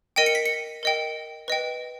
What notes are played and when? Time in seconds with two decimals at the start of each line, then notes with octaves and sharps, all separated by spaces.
0.16 A#4 D#5 G5 D#7
0.26 C#7
0.35 B6
0.46 C#7
0.83 A#4 D#5 G5
1.48 B4 D#5 G5